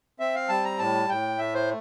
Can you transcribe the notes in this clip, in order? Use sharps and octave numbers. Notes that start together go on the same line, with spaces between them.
C4 E5
F5
G3 A5
A#5
A2 A5
A2 G5
A3 E5
C5